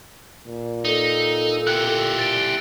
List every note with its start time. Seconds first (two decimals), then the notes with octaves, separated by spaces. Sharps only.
0.47 A#2
0.85 D#4 A4
1.67 E4 G4 F#6 C#7
2.19 A6 D7